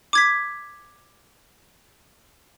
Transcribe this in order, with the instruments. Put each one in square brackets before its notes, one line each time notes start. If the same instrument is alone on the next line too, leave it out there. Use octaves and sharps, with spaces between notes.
[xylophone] D6 G#6 B6